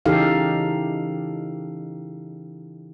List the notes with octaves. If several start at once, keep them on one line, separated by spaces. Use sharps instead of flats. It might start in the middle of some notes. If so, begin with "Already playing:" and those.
C#3 E3 D#4 G4 A4 F5